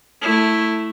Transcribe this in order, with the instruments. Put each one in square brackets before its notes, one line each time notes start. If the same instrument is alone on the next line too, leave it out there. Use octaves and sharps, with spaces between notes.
[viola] A3 E4